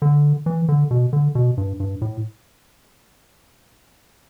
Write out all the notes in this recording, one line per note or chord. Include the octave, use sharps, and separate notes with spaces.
D3
E3
D3
B2
D3
B2
G2
G2
A2